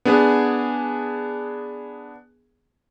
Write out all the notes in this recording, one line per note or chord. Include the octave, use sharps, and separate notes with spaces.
B3 D4 G#4 G#5